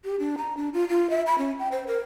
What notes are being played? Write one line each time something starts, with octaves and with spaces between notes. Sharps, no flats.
G4
D4
A#5
D4
F4
F4
E5
B5
C#4
G5
C5
A#4